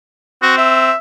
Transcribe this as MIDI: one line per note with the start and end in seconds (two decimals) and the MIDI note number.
0.42 0.91 60
0.42 0.54 66
0.58 0.96 76